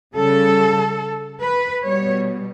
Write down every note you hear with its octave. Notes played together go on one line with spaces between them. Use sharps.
C#3 G3 A4
B4
B2 G3 C#5